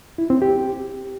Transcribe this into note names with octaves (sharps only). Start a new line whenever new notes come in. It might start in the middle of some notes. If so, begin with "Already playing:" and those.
E4
C4
G4